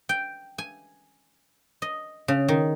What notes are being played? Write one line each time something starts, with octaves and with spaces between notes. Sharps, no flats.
G5
G#5
D#5
C#3
D#3